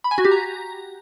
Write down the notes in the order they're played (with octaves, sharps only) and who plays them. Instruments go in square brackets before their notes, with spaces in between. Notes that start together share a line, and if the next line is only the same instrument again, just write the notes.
[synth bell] B5
G#5
F#4
G4
A#5